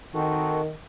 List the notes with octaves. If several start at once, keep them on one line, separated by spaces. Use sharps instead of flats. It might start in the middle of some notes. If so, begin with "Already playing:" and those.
D#3 C4 F#4 A4